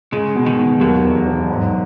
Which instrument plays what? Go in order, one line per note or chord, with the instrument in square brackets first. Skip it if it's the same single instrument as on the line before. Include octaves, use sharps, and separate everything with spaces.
[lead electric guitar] C#3 [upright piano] G#3
[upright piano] B2
[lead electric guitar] D#3
[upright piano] B2
[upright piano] D#2 [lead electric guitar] F#3
[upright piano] E1
E1
G#2